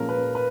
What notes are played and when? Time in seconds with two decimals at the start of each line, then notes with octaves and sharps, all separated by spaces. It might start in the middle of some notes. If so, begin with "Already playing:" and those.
Already playing: A#2 F3 G#3 C#4 A#4
0.09 B4
0.35 B4